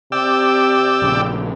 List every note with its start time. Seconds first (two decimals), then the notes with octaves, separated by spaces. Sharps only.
0.12 C3 D5 G5 E6
1.02 A#1 C#3